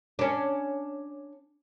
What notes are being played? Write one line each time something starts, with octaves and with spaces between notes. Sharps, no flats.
C#4 D4